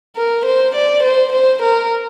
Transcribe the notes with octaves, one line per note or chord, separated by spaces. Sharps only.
A#4
C5
D5
C5
C5
A#4